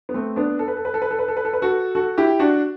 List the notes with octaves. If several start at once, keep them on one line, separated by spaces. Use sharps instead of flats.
B3
A3 C4
B3 D4
A4
B4
A4
B4
A4
B4
A4
B4
A4
B4
A4
B4
F#4 A4
F#4 A4
E4 G4
D4 F#4